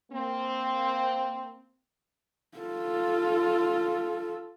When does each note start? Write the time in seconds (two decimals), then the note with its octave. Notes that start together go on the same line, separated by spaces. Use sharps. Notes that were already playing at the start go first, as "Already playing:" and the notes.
0.12 A#3 C4
2.57 F4 A4